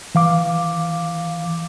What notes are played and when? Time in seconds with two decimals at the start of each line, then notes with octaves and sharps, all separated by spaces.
0.15 E3 F5 D6